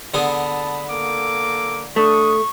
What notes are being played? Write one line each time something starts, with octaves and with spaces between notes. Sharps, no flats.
D3 B3 G#4 A5 B5
A#3 A4 D6
A3 D4 C#6 D#6